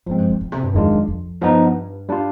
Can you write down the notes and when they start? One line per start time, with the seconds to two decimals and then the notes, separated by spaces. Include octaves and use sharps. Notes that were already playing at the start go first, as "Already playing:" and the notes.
0.07 G#2 F3 G#3 C4
0.18 G2
0.30 G2
0.41 G#2
0.52 C3
0.63 G2
0.74 F2 D#3 G#3 D4 F4
0.91 F2
1.08 F2
1.41 G2 F3 B3 D#4
2.09 G3 D4 F4